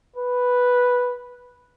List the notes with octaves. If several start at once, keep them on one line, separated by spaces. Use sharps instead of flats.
B4